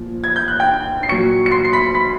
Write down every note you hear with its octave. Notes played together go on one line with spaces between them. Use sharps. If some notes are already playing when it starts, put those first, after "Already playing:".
Already playing: A#2 F3
G#6
G6
F#6
G5 G6
C7
A#2 F#3 C#6 C#7
C#7
C6 C7
C7
B5 B6
B5 B6